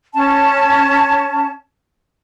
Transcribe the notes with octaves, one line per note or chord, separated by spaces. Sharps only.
C#4 A5